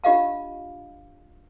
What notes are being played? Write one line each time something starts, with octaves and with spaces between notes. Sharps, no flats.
D4 F4 G4 D#5 F5 A5